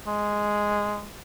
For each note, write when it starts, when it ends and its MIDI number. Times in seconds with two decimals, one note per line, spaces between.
0.07 1.07 56